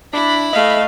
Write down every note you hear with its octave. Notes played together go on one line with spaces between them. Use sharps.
D4 E4 B5
A3 D#5 F5